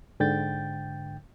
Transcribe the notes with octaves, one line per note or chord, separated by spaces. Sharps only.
G#2 D3 G5 G6 A6